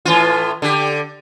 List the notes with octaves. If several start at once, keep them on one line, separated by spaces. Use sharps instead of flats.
A2 E3 F4
D3 G4